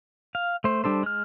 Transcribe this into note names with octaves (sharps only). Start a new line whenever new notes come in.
F5
A3 C5
G3 D4 A4 C5
G#3 F6